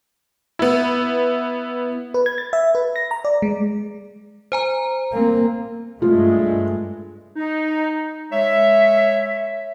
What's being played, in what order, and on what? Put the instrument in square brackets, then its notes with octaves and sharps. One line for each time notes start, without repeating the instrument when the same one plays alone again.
[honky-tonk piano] B3 E4
[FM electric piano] B4
G#6
A6
E5
B4
A#6
A#5
D5
G#3
[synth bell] C5 G#5 A#5
[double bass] A#3 C4
[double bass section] G2 G#3 A3 [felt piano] F4
[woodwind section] D#4
G#3 C#5 E5